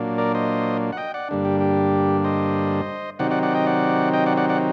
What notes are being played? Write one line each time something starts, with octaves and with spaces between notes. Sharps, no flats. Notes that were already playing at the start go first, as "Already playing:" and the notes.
Already playing: A#2 F#3 A#3 D4
A#4 D5
C5 D#5
F#5
D#5 G5
D5 F#5
G2 D3 G3 A#3 D4
G4
G4
C5 D#5
C3 D#3 F#3 C4 D#4 D5 F#5
D5 F#5
D5 F#5
D#5 G5
D5 F#5
D#5 G5
D5 F#5
D5 F#5
D5 F#5